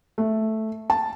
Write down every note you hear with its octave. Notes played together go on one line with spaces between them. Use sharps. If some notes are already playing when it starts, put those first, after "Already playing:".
A3
A5